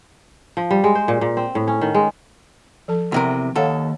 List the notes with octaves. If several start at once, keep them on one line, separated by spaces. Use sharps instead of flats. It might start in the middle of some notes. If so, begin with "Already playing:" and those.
F3
G3
G#3
C5
A#2
A#2
C4
A2
C#4
D#3
G#3
F3 A4 A5
E2 C3 A#4
D#2 A4 C#5 F5 F#5